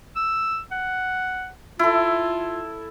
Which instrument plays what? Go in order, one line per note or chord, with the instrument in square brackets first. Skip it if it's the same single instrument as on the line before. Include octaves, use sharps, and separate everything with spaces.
[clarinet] E6
F#5
[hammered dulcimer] E4 A4 [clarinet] F4